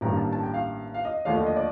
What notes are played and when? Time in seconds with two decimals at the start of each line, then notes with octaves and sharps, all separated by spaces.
0.01 A1 G2 D#3 G3 A#3 A#5
0.17 A5
0.33 A5
0.43 G5
0.54 F5
0.94 F5
1.05 D#5
1.25 D#2 D3 F3 A3 D4 F5
1.36 D#5
1.47 D#5
1.57 D5